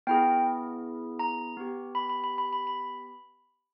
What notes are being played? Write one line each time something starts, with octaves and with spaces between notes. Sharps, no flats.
B3 E4 G#4 G5
A#5
B3 G4
B5
B5
B5
B5
B5
B5